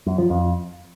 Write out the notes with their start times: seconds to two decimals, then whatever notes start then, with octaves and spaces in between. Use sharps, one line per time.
0.06 F#2
0.18 F3
0.30 F2